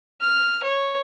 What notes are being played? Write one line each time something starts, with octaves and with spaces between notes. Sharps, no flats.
F6
C#5